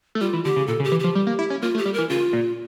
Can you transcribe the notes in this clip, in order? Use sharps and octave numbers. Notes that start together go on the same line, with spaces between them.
A3
G3 F4
E3
D3 G4
C#3
A#2 A4
C#3
G4
E3
F3 G4
G3
A#3
E4
C#4
A#3 F4
A3
G4
G3
E3 A#4
C#3 F4
A#2